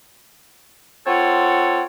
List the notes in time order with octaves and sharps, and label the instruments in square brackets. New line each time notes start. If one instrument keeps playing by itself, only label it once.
[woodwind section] C4 F4 A4 C#5 F#5